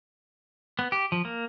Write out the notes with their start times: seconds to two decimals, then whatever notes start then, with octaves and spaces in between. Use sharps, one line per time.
0.79 B3
0.92 G4
1.12 F3
1.25 A#3